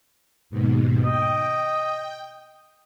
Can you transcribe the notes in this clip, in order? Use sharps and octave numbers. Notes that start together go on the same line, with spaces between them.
D#2 G#2 B2
D#5 G5